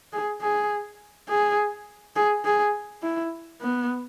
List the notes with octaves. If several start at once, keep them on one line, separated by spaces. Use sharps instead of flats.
G#4
G#4
G#4
G#4
G#4
E4
B3